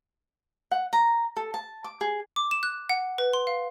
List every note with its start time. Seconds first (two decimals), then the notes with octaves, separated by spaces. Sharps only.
0.71 F#5
0.93 A#5
1.37 A4
1.54 A5
1.84 D6
2.01 G#4
2.36 D6
2.51 E7
2.63 F#6
2.89 F#5
3.18 B4
3.33 C6
3.47 F5